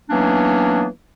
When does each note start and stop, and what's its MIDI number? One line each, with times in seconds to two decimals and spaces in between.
0.10 0.86 52
0.10 0.86 54
0.10 0.86 58
0.10 0.86 59
0.10 0.86 61
0.10 0.86 62